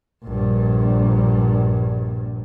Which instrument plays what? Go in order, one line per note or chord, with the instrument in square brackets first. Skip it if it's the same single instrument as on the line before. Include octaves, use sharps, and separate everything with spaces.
[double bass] A#1 G2